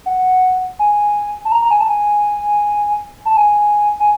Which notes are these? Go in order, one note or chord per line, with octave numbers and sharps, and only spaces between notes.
F#5
G#5
A5
A#5
A#5
G#5
A5
G#5
A5
G#5
G#5